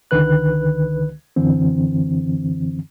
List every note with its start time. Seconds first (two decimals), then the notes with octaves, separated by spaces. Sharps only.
0.11 C#2 D3 D#3 B4 F#6
1.36 F#2 D3 E3 C4